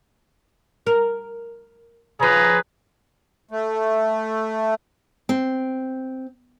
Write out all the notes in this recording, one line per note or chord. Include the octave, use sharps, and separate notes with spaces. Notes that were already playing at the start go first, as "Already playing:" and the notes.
A#4
C#3 F3 G#4 B4 A#5
A3
C4